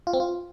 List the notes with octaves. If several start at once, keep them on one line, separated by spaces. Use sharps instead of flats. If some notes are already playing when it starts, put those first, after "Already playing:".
F4
C4
F4